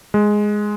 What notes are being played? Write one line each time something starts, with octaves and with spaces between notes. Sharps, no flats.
G#3